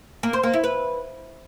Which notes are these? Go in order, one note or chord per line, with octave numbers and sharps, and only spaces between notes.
A#3
C5
A#3
E4
B4